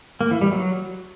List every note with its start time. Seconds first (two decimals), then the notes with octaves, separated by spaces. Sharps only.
0.21 A#3
0.31 E3
0.41 G3
0.52 F#3